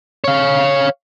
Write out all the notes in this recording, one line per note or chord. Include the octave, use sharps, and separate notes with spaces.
C#5 F5